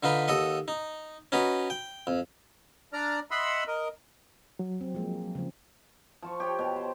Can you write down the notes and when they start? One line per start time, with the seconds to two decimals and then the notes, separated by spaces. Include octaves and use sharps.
0.03 D3 D#4 F4 B4 B5
0.28 D#2 A4 D#5 F#5
0.68 D#4
1.32 C#4 D#4 F#4 B4
1.70 G5
2.07 F2
2.93 D4 D5 A#5 F6
3.31 D#5 E5 F#5 B5 C6 E6
3.68 A#4 D#5
4.59 F#3
4.81 C4
4.95 F3 G#3 A#3
5.35 C#3 F3
6.22 F3 A5 C#6
6.40 G4 C#5 G5
6.59 B2 G4
6.76 C5